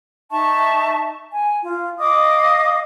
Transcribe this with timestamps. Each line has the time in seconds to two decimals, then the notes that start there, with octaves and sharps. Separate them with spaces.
0.31 D#4 E5 A5 C#6
1.32 G#5
1.63 F4
2.00 D#5 F5 D6 D#6